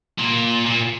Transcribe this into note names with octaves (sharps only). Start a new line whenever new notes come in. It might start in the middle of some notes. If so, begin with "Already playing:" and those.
A#2
A#2